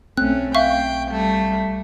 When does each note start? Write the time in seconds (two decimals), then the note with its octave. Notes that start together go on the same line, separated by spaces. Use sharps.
0.17 B1 A3 C4 C#4 F#6
0.55 E5 F5 G5 C#6
1.09 G3 A3